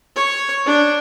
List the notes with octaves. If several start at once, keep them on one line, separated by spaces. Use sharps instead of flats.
C#5
D4